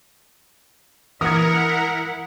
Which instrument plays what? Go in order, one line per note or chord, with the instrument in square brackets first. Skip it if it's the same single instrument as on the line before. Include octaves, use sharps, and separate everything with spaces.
[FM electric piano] E3 [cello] E4 F#5 [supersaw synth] A#4 [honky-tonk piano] D#6 G#6